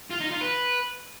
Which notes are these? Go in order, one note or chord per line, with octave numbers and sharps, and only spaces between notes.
F4
D#4
F4
B4